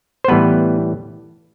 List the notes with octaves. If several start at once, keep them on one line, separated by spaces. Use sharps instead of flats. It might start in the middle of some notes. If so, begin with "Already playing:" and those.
C5
A2 E3 G3 B3 B4